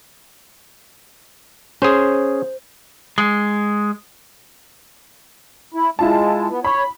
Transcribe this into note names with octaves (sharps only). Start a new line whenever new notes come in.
C#4 G#4 C5
G#3
E4
G#3 E4 F4 A5
B3
C#5 B5